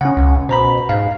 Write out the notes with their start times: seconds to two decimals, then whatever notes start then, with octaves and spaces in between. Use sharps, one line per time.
0.01 C#3 C#4 F#5
0.17 C#2
0.49 B2 C5 A#5 B5
0.89 G#2 F5